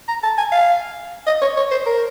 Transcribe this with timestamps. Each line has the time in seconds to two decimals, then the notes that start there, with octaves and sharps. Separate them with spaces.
0.08 A#5
0.23 A5
0.38 G#5
0.52 F5
1.26 D#5
1.42 C#5
1.57 C#5
1.71 C5
1.86 A#4